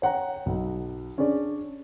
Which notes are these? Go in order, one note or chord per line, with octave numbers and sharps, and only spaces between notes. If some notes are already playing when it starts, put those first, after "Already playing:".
C#5 F#5 G5 A#5
B1
C#4 D4 G#4 D5